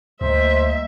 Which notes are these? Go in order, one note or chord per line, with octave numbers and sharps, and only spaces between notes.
D2 G3 A#3 C5 D#5 E5